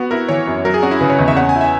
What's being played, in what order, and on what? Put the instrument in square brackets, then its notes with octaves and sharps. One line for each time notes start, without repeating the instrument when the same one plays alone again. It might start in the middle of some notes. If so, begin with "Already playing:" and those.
Already playing: [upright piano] B3 [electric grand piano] F#4
[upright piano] E4 [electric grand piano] A#4
[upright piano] E3 [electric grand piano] C#5
[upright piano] F#2
[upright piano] F#3 [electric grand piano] A#4
[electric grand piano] G#4
[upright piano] C#4 [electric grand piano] F#4
[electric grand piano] E4
[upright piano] C#3 [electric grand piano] B4
[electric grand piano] C#5
[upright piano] E2 [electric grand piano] D#5
[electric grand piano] E5
[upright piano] C#4 [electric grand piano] F#5
[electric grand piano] G#5
[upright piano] E4
[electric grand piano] E5